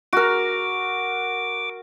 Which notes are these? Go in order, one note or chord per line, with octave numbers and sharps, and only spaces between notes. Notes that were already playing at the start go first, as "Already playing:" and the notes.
F#4 A#4 D6